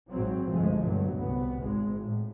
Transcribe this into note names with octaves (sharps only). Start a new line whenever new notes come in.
G#1 G#2 F#3 C4
G1 C2 F3 G#3 A3
G2 B2 D3 F#3 A3
C2 B3
G#1 G#3
A2